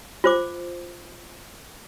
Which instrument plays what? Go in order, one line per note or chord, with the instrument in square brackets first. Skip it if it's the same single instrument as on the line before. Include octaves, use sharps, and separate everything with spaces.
[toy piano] F4 C5 D6